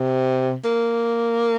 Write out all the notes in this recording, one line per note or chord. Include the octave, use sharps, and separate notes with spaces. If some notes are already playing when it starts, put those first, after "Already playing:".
Already playing: C3
A#3